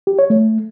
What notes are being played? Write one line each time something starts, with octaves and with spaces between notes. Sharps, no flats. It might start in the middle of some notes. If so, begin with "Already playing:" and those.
G4
C#5
A3